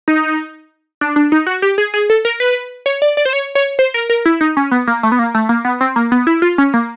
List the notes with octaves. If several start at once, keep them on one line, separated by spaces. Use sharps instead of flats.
D#4
D4
D4
D#4
F#4
G4
G#4
G#4
A4
A#4
B4
C#5
D5
D5
C5
C#5
C#5
C5
A#4
A#4
E4
D#4
C#4
B3
A#3
A3
B3
A#3
A3
A#3
B3
C4
A#3
B3
E4
F4
C#4
A#3